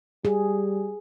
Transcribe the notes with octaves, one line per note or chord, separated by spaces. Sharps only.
G3 G#4